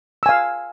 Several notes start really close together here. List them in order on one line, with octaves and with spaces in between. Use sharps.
E6 G#5 F5